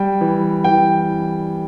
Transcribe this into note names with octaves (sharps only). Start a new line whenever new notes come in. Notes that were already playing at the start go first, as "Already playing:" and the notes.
Already playing: G3 G5
E3
E3 G5